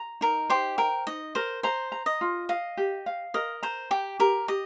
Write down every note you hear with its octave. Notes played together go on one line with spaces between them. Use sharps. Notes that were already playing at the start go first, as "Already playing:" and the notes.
Already playing: A#5
D#4 A#4
G4 C5
A#4 G5
D#4 D#5
A#4 C5
C5 A#5
A#5
D#5
F4
D#5 F5
G4
F5
A#4 D#5
C5 A#5
G4 G5
G4 A#4
G4 D#5